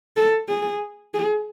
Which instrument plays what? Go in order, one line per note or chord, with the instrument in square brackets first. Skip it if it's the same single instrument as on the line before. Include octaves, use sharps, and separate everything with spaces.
[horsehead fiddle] A4
G#4
G#4